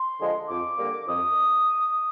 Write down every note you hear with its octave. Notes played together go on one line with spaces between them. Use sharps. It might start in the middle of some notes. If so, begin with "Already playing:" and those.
Already playing: C6
D3 F3 G#3
F2 D6
D3 G3 A#3
F2 D#6